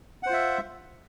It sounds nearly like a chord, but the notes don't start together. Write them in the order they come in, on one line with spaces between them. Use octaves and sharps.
F#5 C5 F4 E5